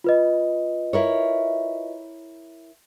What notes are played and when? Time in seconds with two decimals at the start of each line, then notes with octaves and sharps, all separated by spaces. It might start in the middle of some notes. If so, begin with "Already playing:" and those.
0.04 F4 B4 D#5
0.93 E4 A#4 C#5